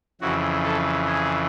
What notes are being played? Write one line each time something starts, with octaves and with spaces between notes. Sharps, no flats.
F2 C#3 E3 F#4
A4
G#4